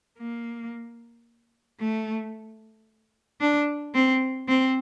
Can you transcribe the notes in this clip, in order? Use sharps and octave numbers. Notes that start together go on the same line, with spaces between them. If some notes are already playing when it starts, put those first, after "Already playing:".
A#3
A3
D4
C4
C4